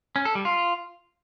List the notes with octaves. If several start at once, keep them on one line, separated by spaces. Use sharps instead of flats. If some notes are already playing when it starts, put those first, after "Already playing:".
C#4
A4
G3
F4